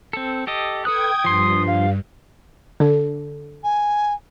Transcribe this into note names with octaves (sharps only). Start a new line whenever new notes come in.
C4 A4
G4 A4 D#5
A4 B4 G5 D#6 F#6 G#6
G2 F3 C6
F5
D3 A4
G#5